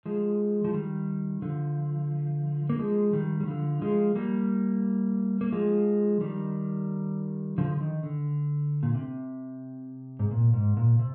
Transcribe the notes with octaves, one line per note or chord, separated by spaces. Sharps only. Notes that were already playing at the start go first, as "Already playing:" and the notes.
F3 G#3
F3
D#3 G3
D3 F3
A#3
F3 G#3
D#3 G3
G3
D3 F3
F3 G#3
G3 A#3
A#3
F3 G#3
D#3 G3
D3 F3
F3
D#3
D3
A#2
C3
G#2
A#2
G#2
A#2
C3